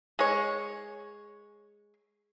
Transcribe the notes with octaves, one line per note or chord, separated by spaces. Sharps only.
G#3 C#5